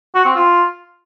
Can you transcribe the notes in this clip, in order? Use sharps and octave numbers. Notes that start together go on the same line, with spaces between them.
F#4
C4
F4